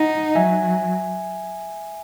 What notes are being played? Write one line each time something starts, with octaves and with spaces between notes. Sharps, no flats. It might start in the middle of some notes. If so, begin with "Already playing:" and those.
Already playing: D#4 D#5 F#5
F#3 E5 G#5